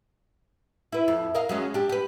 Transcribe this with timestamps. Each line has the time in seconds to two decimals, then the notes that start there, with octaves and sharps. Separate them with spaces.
0.92 E4 B4
1.08 F2
1.35 A#4 D#5 F5
1.49 F#3 G#3 C#4
1.74 D4 G4
1.89 G4 B4